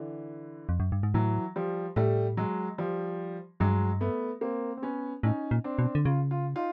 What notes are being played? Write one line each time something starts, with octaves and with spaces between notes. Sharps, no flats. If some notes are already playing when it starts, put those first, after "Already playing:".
Already playing: D3 E3
F2
F#2
G2
G#2
A2 E3 F#3
F3 G3
A2 G3 A3
F#3 G#3
F3 G3
G2 F#3 G#3
A3 B3
A#3 C4
C4
B3 C#4
A2 C#4 D#4
A#2
C4 D4
B2
D3
C#3 F4
F4
D#4 F4